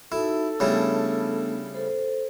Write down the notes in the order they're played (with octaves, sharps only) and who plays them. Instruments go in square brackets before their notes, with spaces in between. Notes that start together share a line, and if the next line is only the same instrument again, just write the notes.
[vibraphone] D#4 F#4 [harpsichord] E4 [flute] A4
[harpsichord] C#3 G3 E4 [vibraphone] A3 B3 D4
[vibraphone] A4 C5